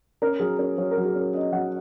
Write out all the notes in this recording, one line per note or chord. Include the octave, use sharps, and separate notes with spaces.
C#4 A#4
F#3 G#4
C#4 A#4
F#3 C#5
A#4
F#3
G#4
C#4 A#4
C#4 D#5
F#3 F#5